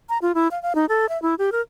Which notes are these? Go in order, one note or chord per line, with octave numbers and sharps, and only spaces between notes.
A#5
F4
E4
F5
F5
D#4
A4
E5
E4
G4
A#4